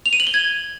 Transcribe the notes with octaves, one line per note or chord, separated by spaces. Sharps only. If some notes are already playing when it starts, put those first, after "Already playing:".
F7
D#7
F#7
G7
G#6